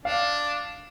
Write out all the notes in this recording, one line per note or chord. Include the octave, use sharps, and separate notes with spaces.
D4 F5